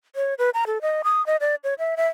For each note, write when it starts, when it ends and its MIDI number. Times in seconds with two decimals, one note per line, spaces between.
0.16 0.34 73
0.39 0.50 71
0.54 0.64 82
0.67 0.81 69
0.82 1.02 75
1.04 1.24 87
1.26 1.36 75
1.41 1.55 74
1.64 1.74 73
1.79 1.95 76
1.97 2.08 76